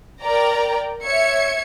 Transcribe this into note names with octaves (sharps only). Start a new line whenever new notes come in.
A#4 D5 G5 A#5
C#5 E5 G#6 C#7